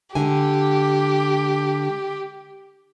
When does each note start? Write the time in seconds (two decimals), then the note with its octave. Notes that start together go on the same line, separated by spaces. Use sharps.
0.15 D3 G#3 G4 G#5